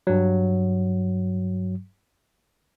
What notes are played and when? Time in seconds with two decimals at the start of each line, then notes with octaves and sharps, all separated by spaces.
0.07 G2 F#3